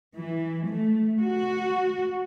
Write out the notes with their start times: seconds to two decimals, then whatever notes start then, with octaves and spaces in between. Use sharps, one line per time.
0.18 E3
0.68 A3
1.22 F#4